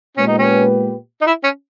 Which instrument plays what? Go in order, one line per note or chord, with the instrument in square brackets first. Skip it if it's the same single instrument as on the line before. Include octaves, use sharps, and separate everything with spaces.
[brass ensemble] A#2 G#3 B3 G4 B4 [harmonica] C#4
[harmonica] D#4
C#4
D#4
E4
C#4